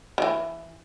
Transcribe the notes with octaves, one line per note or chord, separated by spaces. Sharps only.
D#3 E3